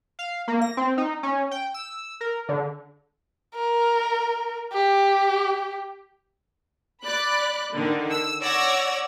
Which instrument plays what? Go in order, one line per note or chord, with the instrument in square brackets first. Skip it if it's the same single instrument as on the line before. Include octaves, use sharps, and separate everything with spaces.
[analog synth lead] F5
A#3
A#6
C4
D#4
C#4
G5
E6
A#4
D3
[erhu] A#4
G4
[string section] D5 B5 F#6
D3 D#3
E6
C#5 D5 F#5 E6 G#6 A#6